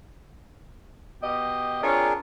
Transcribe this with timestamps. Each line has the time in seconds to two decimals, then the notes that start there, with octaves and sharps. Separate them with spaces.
1.22 B2 G4 D#5
1.83 C4 D4 F4 G#4 A#4 C#5